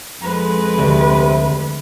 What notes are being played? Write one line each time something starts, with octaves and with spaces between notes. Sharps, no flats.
F2 G#3 B4
D2 C3